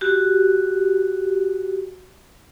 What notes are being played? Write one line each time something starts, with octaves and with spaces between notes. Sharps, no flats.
F#4 G4